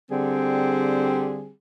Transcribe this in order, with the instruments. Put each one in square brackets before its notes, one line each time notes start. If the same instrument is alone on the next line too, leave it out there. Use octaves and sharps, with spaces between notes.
[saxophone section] D3 G3 C4 G#4